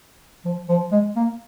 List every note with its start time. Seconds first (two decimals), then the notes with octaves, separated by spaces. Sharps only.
0.45 F3
0.69 F3
0.92 G#3
1.16 A#3